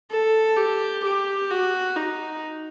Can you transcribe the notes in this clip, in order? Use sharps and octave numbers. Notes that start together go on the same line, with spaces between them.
A4
G4
G4
F#4
D#4